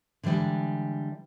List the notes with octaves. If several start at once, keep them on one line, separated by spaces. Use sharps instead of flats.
D3 E3 F3 G3 G#3